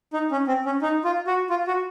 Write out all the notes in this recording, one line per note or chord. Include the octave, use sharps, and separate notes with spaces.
D#4
C#4
C4
C#4
D#4
F4
F#4
F4
F#4